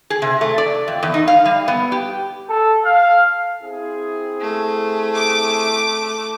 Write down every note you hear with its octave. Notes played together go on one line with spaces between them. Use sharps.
G#4
C3
A3
D5
F2
E2
D#4
F5
G3
B3
G4
A4
F5
C4 E4 G#4
A3
D6